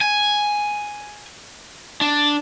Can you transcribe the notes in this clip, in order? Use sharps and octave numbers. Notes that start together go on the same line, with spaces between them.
G#5
D4